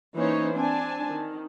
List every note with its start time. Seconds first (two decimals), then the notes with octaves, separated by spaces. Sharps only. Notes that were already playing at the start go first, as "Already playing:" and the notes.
0.16 E3 A#3 C#4 D#4 C5 C#5
0.55 C4 D4 G#5 A5
1.09 D#3